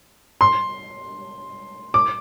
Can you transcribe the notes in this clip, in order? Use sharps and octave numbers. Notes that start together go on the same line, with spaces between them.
C6
D6